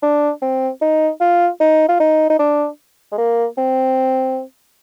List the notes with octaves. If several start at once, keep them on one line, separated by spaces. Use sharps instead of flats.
D4
C4
D#4
F4
D#4
F4
D#4
D#4
D4
G#3
A#3
C4